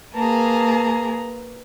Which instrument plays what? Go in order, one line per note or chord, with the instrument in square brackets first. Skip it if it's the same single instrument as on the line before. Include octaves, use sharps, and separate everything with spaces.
[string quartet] A#3 G#4 [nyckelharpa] B4 A#5 [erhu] A5